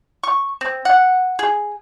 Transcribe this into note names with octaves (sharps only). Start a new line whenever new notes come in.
C#6
C4
F#5
G#4